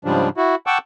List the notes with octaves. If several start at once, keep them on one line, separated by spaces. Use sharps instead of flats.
G#2 C#3 F3 G3 D4
E4 F#4
F#5 G5 A5 C#6 D6 E6